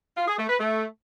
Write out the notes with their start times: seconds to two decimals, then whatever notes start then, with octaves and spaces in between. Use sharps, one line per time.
0.17 F4
0.28 G#4
0.38 A3
0.49 B4
0.60 A3